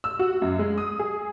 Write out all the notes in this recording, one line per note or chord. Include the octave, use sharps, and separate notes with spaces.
E6
F#4
F#2
G#3
D#6
G#4